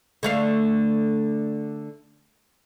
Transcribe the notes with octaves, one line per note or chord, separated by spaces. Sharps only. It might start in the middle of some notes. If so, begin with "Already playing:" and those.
D3 A3 F5